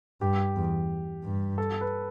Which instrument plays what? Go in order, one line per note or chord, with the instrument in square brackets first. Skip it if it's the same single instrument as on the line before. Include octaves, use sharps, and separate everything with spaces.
[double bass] G2 [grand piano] G4
[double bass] E2
G2
[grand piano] A4
B4